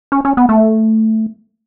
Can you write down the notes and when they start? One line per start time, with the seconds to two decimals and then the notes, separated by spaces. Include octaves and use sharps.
0.12 C#4
0.25 C#4
0.37 B3
0.49 A3